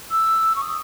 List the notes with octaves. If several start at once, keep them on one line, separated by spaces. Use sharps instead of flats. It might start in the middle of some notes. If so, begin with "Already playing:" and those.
E6
C#6
D#6